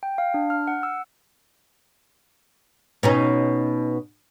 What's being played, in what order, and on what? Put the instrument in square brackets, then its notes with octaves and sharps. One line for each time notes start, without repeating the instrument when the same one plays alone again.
[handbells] G5
F5
D4
F6
F#5
E6
[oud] B2 C#4 D#4